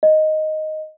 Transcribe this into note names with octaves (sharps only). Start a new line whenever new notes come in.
D#5